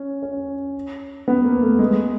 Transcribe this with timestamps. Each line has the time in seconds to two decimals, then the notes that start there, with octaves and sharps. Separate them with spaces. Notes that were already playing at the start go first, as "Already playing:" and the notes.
Already playing: C#4
0.23 C#4
1.28 B3
1.45 A#3
1.63 A3
1.79 G#3